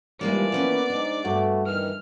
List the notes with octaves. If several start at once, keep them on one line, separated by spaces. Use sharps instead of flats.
D#2 E3 F3 G3 G#3 A#3 D5
A#3 B3 C#4 B4
G#2 D4
G2 A3 B3 F#4
D2 D#3 E3 F6